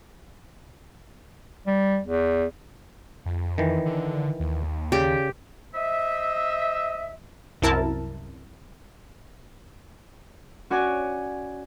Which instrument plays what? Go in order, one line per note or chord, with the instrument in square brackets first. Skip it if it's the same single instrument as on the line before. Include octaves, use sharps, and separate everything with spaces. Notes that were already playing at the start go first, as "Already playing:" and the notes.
[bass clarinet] G3
E2
[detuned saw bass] F2
[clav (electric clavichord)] D#3 E3
[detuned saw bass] D3
D#2
[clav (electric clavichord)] C#3 D5 [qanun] G4
[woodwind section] C5 D#5 E5
[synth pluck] C2 F#2 E4 A#4 A5
[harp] C#4 F#4 C#5 D5 G#5